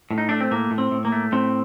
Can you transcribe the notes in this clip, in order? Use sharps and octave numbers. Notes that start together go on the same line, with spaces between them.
A2
D#4
A3 D4
C4
A2 A#3
A2
C4
A2
A#3
A3
A2 C4